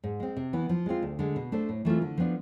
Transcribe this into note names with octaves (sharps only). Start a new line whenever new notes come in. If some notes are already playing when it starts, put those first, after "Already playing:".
G#2
G#3 C4
C3
E3 B3 E4
F3
G#3 C4 F4
D2
D3 G#3
B2
A3 D4 A4 C5
A2
E3 A3 C4 F4
D3
F3 B3 D4